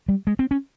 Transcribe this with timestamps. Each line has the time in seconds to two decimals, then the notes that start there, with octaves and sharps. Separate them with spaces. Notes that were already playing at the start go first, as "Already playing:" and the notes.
0.08 G3
0.27 G#3
0.39 C4
0.51 C#4